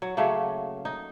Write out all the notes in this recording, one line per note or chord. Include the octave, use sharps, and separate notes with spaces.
F#3
C#3 F#3 A3 A#3
D#4